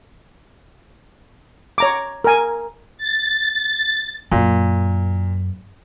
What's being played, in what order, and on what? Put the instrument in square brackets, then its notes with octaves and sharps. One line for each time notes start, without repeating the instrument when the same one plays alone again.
[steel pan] C#5 A#5 D6
A#4 G#5
[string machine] A6
[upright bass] F#2 [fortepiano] A#2